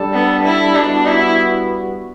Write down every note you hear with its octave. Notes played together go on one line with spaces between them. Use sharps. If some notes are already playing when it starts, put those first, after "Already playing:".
Already playing: G3 D4 A4
B3
E4
G3 B3 D4 F#4
E4